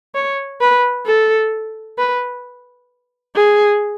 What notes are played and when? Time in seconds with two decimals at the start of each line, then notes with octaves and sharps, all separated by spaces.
0.15 C#5
0.61 B4
1.06 A4
1.98 B4
3.35 G#4